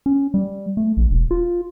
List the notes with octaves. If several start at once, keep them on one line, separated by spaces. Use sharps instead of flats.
C#4
G3
A3
A#1
E1
F4